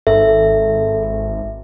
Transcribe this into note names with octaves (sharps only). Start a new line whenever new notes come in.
G#1 A4 E5